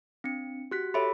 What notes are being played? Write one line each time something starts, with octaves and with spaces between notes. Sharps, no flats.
C4 D4 C#7
F#4 G4 F#6 B6
G4 A4 C#5 E5 B5